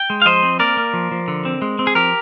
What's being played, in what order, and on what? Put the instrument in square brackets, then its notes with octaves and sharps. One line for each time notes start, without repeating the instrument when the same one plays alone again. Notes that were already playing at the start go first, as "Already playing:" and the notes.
Already playing: [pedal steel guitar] G5
G#3
F5
F3 C5 D#5
C4
A#3 A#4 D5
A#3
F3
F3
D3
C4
G#3
C4
G#4
F3 G4 A#4